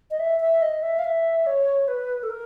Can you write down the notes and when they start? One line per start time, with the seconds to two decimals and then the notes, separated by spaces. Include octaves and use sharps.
0.11 D#5
0.19 E5
0.40 E5
0.62 D#5
0.82 E5
0.99 F5
1.04 E5
1.47 C#5
1.88 B4
2.23 A4
2.30 A#4